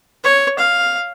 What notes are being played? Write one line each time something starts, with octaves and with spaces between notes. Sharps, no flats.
C#5
F5